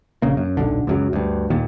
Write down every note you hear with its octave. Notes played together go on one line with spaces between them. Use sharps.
A#1 C#3 A#3
F#2
D#1 B1 D3
C#2 F#2 F#3
D2 G2
D#2 A#2 D#3